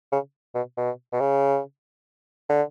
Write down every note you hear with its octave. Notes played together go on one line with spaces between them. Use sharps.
C#3
B2
B2
B2
C#3
D3